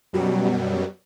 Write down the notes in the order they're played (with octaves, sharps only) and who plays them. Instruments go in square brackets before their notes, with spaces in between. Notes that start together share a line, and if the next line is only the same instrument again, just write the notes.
[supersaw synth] F#2 B2 F#3 G3